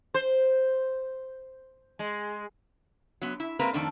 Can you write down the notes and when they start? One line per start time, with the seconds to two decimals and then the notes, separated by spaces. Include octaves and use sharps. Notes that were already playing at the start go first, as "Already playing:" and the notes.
0.14 C5
1.99 G#3
3.22 F#3 B3
3.40 E4
3.59 G#3 A#3 C4 B4 A#5
3.73 F2 D#3 A3 D4